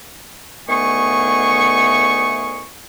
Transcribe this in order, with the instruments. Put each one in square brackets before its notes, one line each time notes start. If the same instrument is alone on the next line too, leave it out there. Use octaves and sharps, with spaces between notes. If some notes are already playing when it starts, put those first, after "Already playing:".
[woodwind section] D2 D#3 A3 B3 G#4 C#6